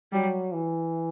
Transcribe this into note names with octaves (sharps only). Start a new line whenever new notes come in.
F#3 G3
E3